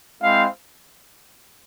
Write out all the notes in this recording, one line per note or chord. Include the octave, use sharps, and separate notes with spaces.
G#3 C4 E4 F5